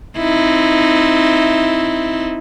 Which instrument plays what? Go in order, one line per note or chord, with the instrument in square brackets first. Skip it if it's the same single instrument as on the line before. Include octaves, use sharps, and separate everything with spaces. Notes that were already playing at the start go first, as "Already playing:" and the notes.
[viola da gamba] C4 D#4 E4